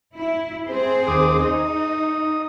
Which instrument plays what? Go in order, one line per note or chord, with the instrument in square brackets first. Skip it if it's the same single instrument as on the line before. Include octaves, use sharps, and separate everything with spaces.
[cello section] E4
C4 G#4 C5
[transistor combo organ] D#2 D6 D#6
[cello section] D#4 [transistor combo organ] D#6